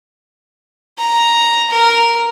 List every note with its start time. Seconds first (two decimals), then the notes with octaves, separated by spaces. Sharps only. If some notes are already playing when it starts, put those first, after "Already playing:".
0.98 A#5
1.70 A#4